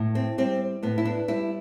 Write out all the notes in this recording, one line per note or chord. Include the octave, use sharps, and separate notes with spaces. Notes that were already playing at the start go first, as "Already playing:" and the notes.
Already playing: A2
C4
G3 C4
A2 B3
E4
D4
G3 E4